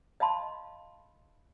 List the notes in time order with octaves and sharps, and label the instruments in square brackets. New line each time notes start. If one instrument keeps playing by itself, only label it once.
[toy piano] D#5 F5 A5 B5 C6